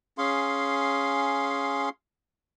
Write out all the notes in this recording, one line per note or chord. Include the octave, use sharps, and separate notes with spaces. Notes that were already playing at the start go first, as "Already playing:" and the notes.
C#4 G#4 F5 C6